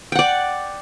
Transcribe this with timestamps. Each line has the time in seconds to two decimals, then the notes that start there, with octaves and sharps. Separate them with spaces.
0.12 G5
0.15 F#5
0.19 D5